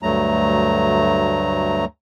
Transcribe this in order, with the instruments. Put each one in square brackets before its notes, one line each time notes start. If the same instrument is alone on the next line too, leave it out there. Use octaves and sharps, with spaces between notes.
[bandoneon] D2 G2 F#3 A3 A#5